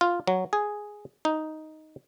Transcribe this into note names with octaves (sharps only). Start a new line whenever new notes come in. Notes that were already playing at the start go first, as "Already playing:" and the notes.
F4
F#3
G#4
D#4